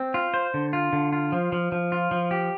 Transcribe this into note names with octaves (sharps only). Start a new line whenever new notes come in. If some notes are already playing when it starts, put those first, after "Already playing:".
Already playing: C4
F4
C5
D3
F4
D3
F4
F3
F3
F3
F4
F3
G4